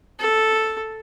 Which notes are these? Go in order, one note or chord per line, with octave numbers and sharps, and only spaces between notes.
A4